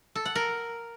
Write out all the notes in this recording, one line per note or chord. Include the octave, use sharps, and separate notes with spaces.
A4
F#5
A#4